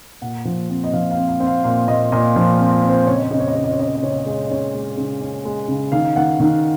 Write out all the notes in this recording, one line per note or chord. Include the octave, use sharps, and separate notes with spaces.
A#2 F#5
F3
C4
D#5
F3 F5
F5
C4
F5
C4
F5
A#2 F5
A#2 D#5
A#2 D#5
F3 F5
C4 F5
F5
C4
C5
C#3 C#5
D#5
C#5
C#3 D#5
C#5
D#5
C#3 C#5
D#5
C#5
C#4 D#5
C#5
D#5
C#3 C#5
D#5
C#5
G#3 D#5
C#5
D#5
C#4 C#5
G#3
C#3
C#4
G#3
C#3
D#3 F5
D#3 F#5
D#3 F5